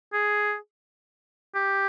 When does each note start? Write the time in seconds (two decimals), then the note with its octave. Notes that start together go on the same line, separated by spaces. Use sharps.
0.13 G#4
1.55 G4